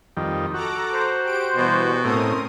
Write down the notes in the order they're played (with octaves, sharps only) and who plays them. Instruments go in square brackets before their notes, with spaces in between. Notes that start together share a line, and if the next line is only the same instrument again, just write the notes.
[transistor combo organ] F2 D#3 G3
[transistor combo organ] F#4 [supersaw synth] A4 A#5 D6
[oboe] C5
[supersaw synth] G4 D7
[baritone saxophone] B2 [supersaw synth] E3 G3 B3
[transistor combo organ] A2 C4 [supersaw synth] C#4 A#4 D#6